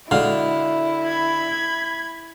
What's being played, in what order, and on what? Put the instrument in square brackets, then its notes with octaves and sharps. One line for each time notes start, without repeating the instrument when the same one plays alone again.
[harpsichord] D3 [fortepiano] G#3 F#4 F5 [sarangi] E4
[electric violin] B5 G#6